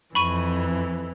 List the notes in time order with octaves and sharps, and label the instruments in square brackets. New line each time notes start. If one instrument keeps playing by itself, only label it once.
[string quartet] F2 E3 [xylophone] B5 C#6 D#7